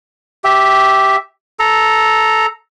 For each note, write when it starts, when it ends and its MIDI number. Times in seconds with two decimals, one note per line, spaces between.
0.44 1.16 67
0.44 1.16 76
1.59 2.46 69
1.59 2.46 82